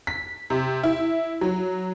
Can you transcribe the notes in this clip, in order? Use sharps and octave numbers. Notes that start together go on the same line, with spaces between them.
B6
C3
E4
F#3